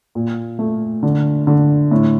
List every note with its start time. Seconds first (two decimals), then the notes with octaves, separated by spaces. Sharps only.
0.15 A#2
0.59 A3
1.03 D3
1.47 D3
1.91 A2